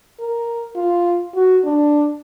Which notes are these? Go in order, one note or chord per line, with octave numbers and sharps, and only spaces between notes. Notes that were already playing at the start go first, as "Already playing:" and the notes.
A#4
F4
F#4
D4